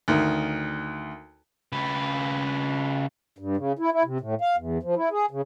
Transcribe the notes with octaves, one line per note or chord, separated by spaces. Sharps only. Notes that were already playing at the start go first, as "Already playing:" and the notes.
D2 D#3
C#3 B4
G2
C#3
E4
E4
C3
A2
F5
E2
F3
E4
G#4
C#3